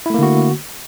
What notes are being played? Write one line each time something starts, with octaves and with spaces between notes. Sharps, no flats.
D3 A3 A#3 E4 F#4